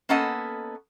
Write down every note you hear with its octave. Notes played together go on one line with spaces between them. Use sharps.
A#3 B3 C#4 A4 D#5 F#5